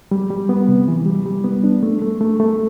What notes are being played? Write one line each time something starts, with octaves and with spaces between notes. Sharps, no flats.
G3
G3
B3
C3
E3
G3
G3
B3
D4
A3
A3
A3
A3